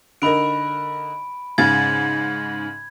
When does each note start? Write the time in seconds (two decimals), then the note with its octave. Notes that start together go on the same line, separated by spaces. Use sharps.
0.22 D3 D#4 A#4 B5 D7
1.58 G#2 C#3 G#6 A6